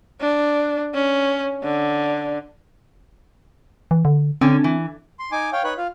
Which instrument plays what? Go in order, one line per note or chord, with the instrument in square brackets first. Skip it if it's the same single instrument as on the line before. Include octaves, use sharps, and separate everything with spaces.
[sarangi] D4
C#4
D3
[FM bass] E3
D3
[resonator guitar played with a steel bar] D3 C#4 [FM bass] C4
[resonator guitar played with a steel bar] E3
[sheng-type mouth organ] C6
D#4 G#5 D6
C#5 F5 G5
D#4 B4 C#5 F#6
F4 F5